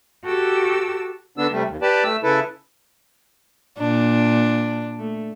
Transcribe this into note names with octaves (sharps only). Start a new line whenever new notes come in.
F#4 G4 A4 E6
D3 B3 D4 E6
C3 G3 A3
D#2
G4 B4 D5 A5
A3 E6
C#3 E4 A4 B4
A#2 D4
A3